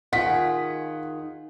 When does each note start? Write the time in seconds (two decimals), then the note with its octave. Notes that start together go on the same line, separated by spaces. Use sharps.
0.13 D#3 F4 G#4 F#5 B6